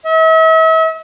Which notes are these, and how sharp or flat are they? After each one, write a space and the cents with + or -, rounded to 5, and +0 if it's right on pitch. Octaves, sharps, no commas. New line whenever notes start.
E5 -40